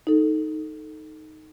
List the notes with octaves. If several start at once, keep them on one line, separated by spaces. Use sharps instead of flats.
D#4 A4